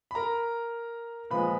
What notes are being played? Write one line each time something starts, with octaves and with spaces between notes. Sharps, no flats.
B5
A#4 A#5
A#2 F3 G#3 B4 B5